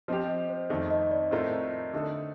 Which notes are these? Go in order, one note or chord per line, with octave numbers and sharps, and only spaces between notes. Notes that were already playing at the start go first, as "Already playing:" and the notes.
F3 C4 G4 D#5
D#5
C5
F2 D#3 A3
D#5
D5
A2 A3 C4 F4 A#4
D3 A3 D#4 A4